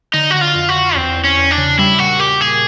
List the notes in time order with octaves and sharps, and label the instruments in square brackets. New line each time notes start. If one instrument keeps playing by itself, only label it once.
[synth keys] D3 [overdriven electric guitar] D#4
[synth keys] D3 [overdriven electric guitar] F#4
[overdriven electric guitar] F4
[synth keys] F2
[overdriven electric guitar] F#4
[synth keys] D3
[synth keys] E2 [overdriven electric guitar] C4
[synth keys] E2
[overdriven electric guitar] C#4
[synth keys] E2
[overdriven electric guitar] D4
[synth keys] C#3
[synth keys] G3 [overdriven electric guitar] E4
[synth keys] A#2 [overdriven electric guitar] F#4
[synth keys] A#2 [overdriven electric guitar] G4
[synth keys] A#2 [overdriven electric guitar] G#4